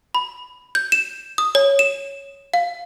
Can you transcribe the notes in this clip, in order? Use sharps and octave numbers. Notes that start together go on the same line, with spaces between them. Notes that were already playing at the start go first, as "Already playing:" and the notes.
B5
G6
E7
D#6
C#5
E7
F5